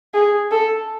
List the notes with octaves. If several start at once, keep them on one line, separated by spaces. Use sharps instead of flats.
G#4
A4